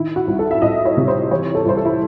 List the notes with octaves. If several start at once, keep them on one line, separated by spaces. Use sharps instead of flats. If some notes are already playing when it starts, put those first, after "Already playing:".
Already playing: D#3 E4
F#4
C2
A4
E5
C2 D#5
C#5
C3
C5
E3 C#5
A4
C2 C5
A4
E4